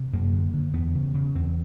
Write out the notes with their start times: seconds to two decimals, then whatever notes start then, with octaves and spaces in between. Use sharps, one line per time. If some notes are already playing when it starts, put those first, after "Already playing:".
Already playing: C3
0.13 F#2 A#3
0.33 D3
0.54 D3
0.73 E2 B3
0.95 C#3
1.14 C#3
1.35 E2 C4